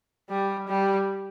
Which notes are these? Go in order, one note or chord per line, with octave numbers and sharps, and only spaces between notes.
G3
G3